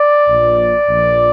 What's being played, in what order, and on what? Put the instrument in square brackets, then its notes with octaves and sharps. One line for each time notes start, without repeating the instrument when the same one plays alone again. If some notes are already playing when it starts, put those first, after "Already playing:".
Already playing: [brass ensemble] D5
A#1 A#2 F3
A#1 A#2 F3